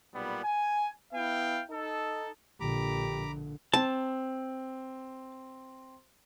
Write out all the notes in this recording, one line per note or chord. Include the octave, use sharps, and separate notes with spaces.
B1 A#2 G3 B3
G#5
B3 E4 F5 G5
D#4 A4
A#1 A#2 D3 G4 A#5 B5 D6
C4 A5